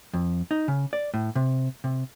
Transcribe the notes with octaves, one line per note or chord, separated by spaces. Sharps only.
F2
D#4
C#3
D5
A2
C3
C3